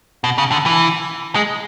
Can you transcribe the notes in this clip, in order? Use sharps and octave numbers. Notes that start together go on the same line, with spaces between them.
B2
C#3
D3
E3
G#3